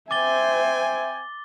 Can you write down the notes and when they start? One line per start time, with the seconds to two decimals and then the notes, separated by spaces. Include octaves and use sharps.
0.11 C4 C5 E5 G5 G#5 D6 A6 G7